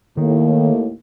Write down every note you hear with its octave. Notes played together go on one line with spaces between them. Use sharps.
D#2 A2 D#3 A#3